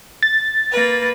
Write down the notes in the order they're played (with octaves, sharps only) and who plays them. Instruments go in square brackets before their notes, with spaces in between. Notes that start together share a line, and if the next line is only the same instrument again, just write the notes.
[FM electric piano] A6
[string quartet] A#3 B4